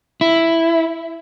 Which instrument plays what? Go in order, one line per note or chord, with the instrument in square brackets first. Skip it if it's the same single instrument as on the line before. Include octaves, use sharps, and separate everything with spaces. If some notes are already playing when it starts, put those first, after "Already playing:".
[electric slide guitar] E4